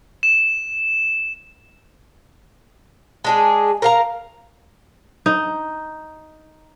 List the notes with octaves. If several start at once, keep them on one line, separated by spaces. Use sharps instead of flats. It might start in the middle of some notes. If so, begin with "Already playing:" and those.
E7
G#3 D4 G#4
A#4 F5 A#5
D#4